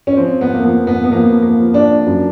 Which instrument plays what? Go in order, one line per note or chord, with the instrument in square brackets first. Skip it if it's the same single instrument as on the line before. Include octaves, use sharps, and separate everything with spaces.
[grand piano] C#4
F3 C4
B3
A#3
F3 B3
B3
B3
F3 A#3
A#3
F3
D4
F#2